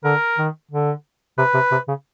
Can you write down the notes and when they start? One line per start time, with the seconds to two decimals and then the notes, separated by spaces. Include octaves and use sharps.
0.04 D3 A#4
0.38 D#3
0.71 D3
1.38 C3 B4
1.54 C3
1.72 C3
1.88 C#3